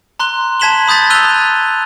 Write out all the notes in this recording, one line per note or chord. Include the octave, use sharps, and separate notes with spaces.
A#5 C6 F#6 G7
A5 G#6 B6 E7 F#7 G7
B5 D#6 G6 A6 B6
E6 F#6 D#7 F7 G7